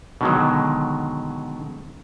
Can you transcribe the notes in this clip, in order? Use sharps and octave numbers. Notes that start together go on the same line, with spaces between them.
B2 D3 D#3 F#3 G#3